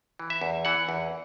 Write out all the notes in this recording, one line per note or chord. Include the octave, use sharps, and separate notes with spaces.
E3
E5
E2
E3 F#5
E2